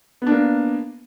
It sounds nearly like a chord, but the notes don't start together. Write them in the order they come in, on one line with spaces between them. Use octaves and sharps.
B3 D4 A#3